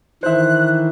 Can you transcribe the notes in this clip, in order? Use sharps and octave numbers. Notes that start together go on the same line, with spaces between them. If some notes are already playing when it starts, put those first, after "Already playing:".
D#3 E3 C5 E5 F#6